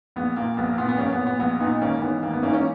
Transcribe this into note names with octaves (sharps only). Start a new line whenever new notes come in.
A#1 B3
A#2 A#3
A#1 B3
A#3
A#2 B3
B3
A#1 A#3 C#4
B3
A#2
B3
A#1 B3
A#2 B3 D#4
G#1 A#3 C#4
G#2 E3 B3
G#1 A#3
B3
G#2 E3 A#3 C#4
A#3 C#4